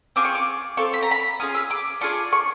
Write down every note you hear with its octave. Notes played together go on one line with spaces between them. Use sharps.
C4 F4 G#4 D6
C#6
D6
C4 F4 A4 C#6
B5
A#5
B5
C#4 F4 G#4 D#6
E6
D6
D4 F4 G#4 C#6
C#6